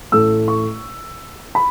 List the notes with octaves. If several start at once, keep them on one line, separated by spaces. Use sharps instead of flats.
A1 A2 A3 E6
C#6
B5